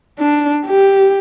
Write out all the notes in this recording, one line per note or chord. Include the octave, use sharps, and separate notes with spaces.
D4
G4